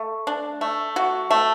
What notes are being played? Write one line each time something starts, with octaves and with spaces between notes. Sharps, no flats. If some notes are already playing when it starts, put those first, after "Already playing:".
Already playing: A3
D4
A3
F#4
A3